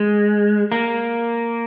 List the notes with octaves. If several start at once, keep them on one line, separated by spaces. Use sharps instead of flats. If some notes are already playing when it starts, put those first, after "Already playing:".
Already playing: G#3
A#3